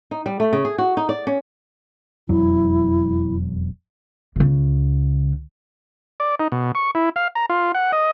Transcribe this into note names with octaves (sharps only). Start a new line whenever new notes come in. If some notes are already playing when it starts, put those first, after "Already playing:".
D#4
G3
A3
C#3
G#4
F#4
D#4
D5
C#4
E1 F2 F#3 E4
C#2 C#3
D5
D#4
B2
C#6
E4
F5
A#5
F4
F#5
D#5